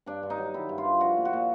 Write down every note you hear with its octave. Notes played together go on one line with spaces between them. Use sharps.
G2 D4
G2
D#4
F#3
D#3 E4
G2
F4
G2
F3 F#4
A#2
F#4
A#2